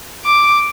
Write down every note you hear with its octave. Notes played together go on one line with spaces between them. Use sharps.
D6